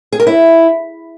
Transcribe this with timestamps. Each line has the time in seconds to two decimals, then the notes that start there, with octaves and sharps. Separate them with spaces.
0.12 G#4
0.20 A#4
0.27 E4